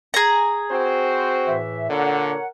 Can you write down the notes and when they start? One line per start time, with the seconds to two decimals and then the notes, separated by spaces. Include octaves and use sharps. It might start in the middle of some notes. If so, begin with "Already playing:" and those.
0.14 G#4 A#5
0.72 C4 F#4 C5
1.47 A2 E3 E5
1.90 A#2 D3 A#4 C#5 F#5